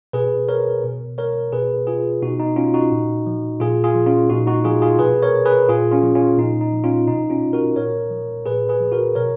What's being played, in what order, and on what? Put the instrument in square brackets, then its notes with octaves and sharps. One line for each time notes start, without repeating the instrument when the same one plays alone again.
[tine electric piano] B2 G#4 B4
A#4 C#5
B2
A#4 C#5
B2 G#4 B4
F4 G#4
B2 D#4 F#4
D#4
C#4 F4
D#4 F#4
A#2
F3
A#2 F4 G#4
F4 G#4
F3
C#4 F4
A#2 D#4 F#4
D#4 F#4
F3 F4 G#4
F4 G#4
B2 G#4 B4
A#4 C#5
G#4 B4
A#2 F4 G#4
C#4 F4
F3
C#4 F4
A#2 D#4
D#4
F3
C#4 F4
B2 D#4
C#4 F4
F#4 A#4
A#2 A#4 C#5
F3
A#2 G#4 B4
G#4 B4
F3
F#4 A#4
B2 A#4 C#5